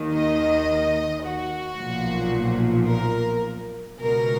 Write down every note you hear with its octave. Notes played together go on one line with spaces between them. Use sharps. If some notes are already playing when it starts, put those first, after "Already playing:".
Already playing: D#2 D#3
D#5
F#4
B1 A#2 F3
A#4
C#2 B2 A#4